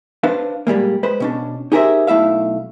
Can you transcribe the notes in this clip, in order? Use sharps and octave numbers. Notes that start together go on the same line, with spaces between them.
D4 B4 C5 F5
A#2 G3 G#3 A#3
G#3 B4 C5
B2 C#4 D4
D#4 G4 G#4 A#4 C5 E5
B1 A3 E4 E5 F5